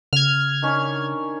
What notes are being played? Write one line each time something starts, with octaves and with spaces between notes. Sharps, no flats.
C#3 F6 G#6
D#3 C#4 D4